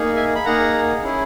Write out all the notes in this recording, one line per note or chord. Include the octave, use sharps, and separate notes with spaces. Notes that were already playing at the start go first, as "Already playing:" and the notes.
Already playing: A#3 D#4 G#4
E5 G#5
B5
A#3 D#4 G#4 F#5 A#5
C#4 E4 G#4